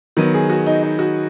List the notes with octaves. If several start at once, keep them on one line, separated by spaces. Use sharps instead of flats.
D#3 F#3 B3
G#4
F#4
D#4
D#4
F#4